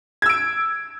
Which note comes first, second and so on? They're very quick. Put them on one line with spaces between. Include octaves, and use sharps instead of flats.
G#6 E6 D7